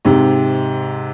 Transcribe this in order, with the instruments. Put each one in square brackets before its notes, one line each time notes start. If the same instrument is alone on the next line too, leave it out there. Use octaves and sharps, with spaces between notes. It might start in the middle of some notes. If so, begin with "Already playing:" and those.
[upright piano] G#2 C3